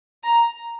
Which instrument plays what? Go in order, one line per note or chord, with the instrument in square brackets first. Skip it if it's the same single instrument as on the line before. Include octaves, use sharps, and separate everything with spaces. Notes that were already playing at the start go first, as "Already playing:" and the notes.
[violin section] A#5